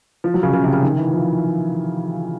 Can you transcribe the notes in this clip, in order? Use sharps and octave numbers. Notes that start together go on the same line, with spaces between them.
F3
F#3
C#3
C#3
C3
C#3
D#3
E3
F3